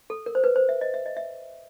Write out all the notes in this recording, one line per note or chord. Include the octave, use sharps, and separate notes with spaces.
A4
A#4
C5
B4
C5
E5
D#5
E5
D#5
E5